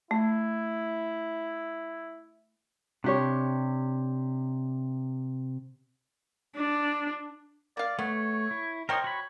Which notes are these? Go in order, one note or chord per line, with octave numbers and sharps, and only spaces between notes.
A3 E4
C3 D4 G4 C#5
D4
A#3 D5 F5
A3 B3 C#5
E4
A#4 C5 C#5 D#5 G5 C6
F#4 C#5 B5